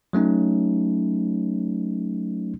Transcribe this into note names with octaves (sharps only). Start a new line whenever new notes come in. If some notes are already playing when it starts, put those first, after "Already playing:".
F#3 A3 C#4 D#4